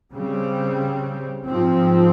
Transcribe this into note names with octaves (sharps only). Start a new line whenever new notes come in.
C#3 G3 C4
G#2 F3 C4